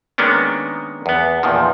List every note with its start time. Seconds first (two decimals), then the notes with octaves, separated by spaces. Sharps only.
0.18 D#3 G#3 A#3 B3 C#4 D4
1.06 E2 B3
1.43 E2 A#2 D#3 F3